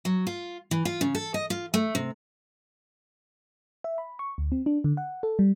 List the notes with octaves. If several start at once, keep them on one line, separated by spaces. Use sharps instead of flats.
F#3
F4
E3
F4
C#3
A4
D#5
F4
A3
C3
E5
B5
C#6
D2
C4
D4
D3
F#5
A4
G3